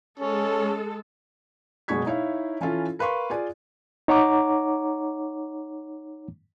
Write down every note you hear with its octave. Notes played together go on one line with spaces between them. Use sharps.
G#3 C#4 A4
F#1 B2 G#3 C#6 G#6 B6
D#4 E4 C#5 F5
E3 C#4 E4 F4 A4
A#4 B4 F5 C6 C#6
F4 G#4 D5 G#5
D#4 C#5 F#5 A#5 D6